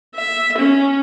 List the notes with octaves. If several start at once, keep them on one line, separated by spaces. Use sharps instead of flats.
E5
C#4